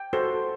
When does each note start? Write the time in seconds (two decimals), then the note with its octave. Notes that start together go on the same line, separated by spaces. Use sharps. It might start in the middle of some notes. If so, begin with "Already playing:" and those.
Already playing: G5
0.13 F#4 A4 C5